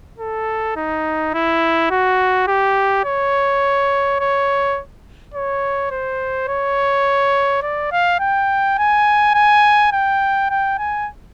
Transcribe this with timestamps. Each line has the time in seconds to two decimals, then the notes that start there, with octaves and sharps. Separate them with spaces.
0.19 A4
0.76 D#4
1.34 E4
1.90 F#4
2.48 G4
3.05 C#5
4.20 C#5
5.34 C#5
5.91 C5
6.48 C#5
7.63 D5
7.92 F5
8.20 G5
8.78 G#5
9.35 G#5
9.93 G5
10.50 G5
10.79 G#5